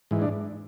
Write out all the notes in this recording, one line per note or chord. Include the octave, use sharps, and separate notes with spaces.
G#2 E3
D4